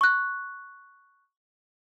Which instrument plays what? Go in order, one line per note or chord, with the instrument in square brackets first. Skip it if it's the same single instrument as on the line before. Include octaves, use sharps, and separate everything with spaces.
[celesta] C#6 F#6